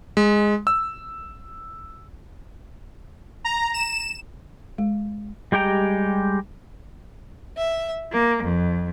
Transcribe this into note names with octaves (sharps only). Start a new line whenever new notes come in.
G#3
E6
A#5
E7
G#3
G3 G#3 G4 G5 A#5
E5
A#3
F2